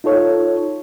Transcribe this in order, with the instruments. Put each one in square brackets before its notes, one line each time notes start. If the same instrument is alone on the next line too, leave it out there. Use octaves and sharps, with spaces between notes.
[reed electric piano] D#4 F4 A4 C#5